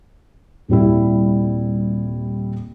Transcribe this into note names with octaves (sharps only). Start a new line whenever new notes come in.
D#1 C3 G3 E4